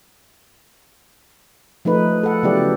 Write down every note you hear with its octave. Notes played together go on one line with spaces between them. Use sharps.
F3 A3 D#4 B4
A4 F#5
C#3 F#3 B3 E4 G4 D5